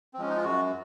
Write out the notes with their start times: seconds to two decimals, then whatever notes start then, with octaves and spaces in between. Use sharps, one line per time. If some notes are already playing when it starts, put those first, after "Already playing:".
0.14 C4
0.18 F3 G#3 C#4
0.29 D#4
0.37 F4
0.44 F#2 F#4